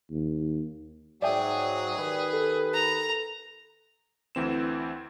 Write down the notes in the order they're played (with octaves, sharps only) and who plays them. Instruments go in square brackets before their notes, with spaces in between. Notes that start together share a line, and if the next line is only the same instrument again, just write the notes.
[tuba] D#2
[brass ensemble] G#2 F#3 [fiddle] G#4 [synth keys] D5 E5 G5
[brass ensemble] D#3 G4 B4
[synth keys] A4
[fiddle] A#5
[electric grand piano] D2 E3 C4 E7